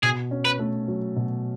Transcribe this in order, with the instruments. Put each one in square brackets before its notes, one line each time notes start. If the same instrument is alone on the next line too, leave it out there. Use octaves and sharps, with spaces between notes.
[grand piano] B2 [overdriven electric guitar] G#4
[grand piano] C#4
[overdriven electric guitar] B4
[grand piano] A3
F#3
B2